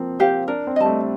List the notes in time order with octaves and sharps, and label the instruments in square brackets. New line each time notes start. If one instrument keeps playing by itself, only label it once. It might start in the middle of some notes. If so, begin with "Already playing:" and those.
Already playing: [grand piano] F3 A#3 C4
[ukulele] G4 C5 F5
[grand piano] D4 [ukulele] A#4
[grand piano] C4
[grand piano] G3 [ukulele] D#5 A5
[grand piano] A3